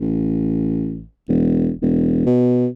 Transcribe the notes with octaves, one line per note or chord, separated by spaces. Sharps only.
A1
E1
E1
B2